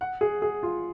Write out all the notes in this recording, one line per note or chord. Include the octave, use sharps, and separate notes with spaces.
F#5
G#4
G#4
F4